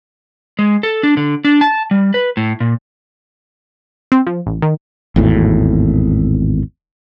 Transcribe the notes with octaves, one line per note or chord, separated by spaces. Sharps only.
G#3
A4
D4
D3
D4
A5
G3
B4
A2
A#2
C4
F3
A1
D#3
G#1 E2 A2